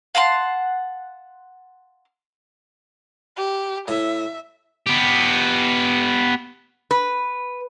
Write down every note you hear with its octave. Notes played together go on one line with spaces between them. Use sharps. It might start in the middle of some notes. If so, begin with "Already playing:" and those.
F5 F#5 A5 C6
G4
A2 E5
B3 G4
B4